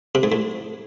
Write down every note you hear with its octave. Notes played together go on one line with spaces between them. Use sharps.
C3
G#2
A2